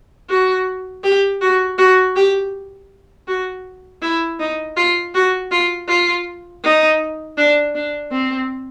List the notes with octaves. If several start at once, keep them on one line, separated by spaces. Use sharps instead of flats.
F#4
G4
F#4
F#4
G4
F#4
E4
D#4
F4
F#4
F4
F4
D#4
D4
D4
C4